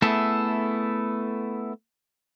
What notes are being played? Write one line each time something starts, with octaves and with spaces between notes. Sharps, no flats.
A3 B3 E4 G#4 A4